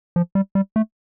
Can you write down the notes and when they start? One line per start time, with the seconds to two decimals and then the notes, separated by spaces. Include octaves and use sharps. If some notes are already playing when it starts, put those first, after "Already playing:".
0.16 F3
0.35 G3
0.55 G3
0.76 A3